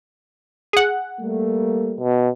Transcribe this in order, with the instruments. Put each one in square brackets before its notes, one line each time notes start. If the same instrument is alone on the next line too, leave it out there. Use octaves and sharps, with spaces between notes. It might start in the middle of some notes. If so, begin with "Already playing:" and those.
[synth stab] G#4 F#5
[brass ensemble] G3 A3 A#3
[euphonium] B2